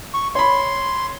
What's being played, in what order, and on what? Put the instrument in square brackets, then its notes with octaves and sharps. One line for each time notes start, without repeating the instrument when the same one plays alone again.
[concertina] C#6
[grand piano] C#5 B5 [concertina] C6